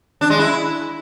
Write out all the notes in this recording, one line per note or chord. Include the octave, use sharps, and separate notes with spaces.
D4
G#3
E4